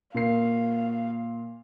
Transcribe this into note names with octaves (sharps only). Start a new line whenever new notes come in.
A#2 A#4 F5 C7